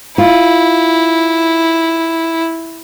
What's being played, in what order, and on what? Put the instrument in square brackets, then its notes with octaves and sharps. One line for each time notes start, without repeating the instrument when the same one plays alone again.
[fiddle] E4 [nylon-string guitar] F4